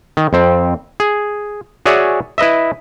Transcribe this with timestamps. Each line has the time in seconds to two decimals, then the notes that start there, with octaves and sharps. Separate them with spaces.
0.17 D#3
0.33 F2 C4
1.00 G#4
1.86 F#4 G#4 C#5 D5 E5 G#5
2.38 E4 B4 D#5 E5